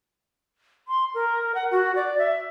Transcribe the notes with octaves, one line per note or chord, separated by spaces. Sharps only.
C6
A#4
F#5
F#4
D5
E5